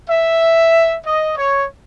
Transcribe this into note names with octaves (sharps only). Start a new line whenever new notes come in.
E5
D#5
C#5